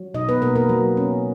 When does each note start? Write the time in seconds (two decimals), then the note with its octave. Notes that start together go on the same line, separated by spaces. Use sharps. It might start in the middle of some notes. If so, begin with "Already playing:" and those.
Already playing: F#3
0.14 B2 D#4 D#5
0.29 B3 B4
0.42 B2 A#3 A#4
0.56 A#3 A#4
0.69 F#3
0.97 C#4